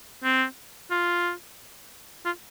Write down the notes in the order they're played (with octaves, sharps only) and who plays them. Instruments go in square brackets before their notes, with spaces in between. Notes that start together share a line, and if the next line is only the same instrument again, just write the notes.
[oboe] C4
F4
F4